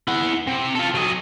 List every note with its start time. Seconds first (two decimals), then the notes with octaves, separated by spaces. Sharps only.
0.08 E4 F#5
0.47 C3
0.75 F4 A4
0.94 F#3 D#5